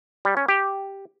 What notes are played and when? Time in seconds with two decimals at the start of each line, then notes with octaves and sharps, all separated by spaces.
0.25 G3
0.37 C#4
0.48 G4